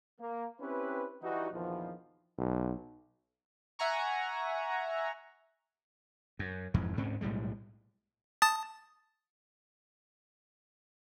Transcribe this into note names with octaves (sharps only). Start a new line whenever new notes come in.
A#3
C4 C#4 E4 G4 B4
E3 G3 D#4 F#4
A#1 E2 B2 D#3 F3
B1
E5 F#5 G#5 A#5 C#6
F#2
F1 F2 G#2 E3
D2 G#2 C4 C#4
B1 A2 G3 G#3
A5 D#6 A6